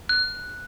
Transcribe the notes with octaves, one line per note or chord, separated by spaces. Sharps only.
F#6